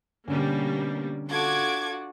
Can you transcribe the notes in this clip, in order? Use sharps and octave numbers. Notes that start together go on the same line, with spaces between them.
B2 D3 G3 A#3 C#4
D4 F4 F#4 A4 D6 G#6